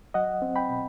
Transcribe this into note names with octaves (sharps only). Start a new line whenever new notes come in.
F#3 D#5 F#5
C4
G5 B5
B2